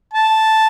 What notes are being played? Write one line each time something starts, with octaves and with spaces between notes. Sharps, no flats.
A5